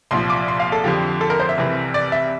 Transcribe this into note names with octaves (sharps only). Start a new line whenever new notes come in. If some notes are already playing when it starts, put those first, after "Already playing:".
C2 A#2 F3 C6
D6
C6
F5
A4
F2 D3 F3 G4
A4
A#4
C5
E5
C2 C3 E3
D5
E5